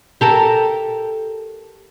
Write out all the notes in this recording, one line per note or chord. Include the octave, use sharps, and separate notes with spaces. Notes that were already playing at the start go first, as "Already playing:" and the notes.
G4 A4 A#4